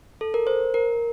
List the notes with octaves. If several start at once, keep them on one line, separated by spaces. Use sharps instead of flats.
A4
A#4
C5
A#4